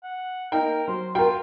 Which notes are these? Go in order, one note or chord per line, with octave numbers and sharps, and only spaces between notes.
F#5
A#3 D#4 A#4 G5
F#3 C5
F4 F#4 A#4 G5